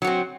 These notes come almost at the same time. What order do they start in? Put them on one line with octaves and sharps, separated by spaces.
F#3 F#4 C4